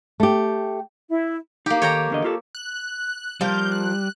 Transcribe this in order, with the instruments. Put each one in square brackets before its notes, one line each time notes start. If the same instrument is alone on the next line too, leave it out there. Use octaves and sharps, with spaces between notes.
[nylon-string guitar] A3 G4
[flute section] E4
[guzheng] A#3 G4 [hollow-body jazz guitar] D#4
[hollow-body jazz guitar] D#3 A4 [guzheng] C#5 G5 A#5
[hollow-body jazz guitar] E2 D3 D#5
F4 G4 A4
[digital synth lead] F#6
[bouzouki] F3 A#3 F5 [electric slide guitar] G3 [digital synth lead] G6
[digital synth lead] F#6